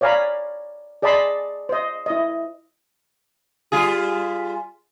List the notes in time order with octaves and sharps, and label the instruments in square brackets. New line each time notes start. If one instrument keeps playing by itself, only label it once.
[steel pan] C#5 D5 F5 G#5 A#5 B5
G#4 D5 D#5 A5 B5 C6
C5 D#5
E4 D#5
[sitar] G3 F4 G#4